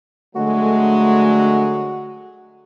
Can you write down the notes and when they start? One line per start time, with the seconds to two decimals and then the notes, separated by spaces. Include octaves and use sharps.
0.36 D3 F#3 G#3 A3 F#4